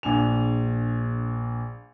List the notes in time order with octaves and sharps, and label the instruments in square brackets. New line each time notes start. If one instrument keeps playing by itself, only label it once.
[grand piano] A#1 D4 G#5 F7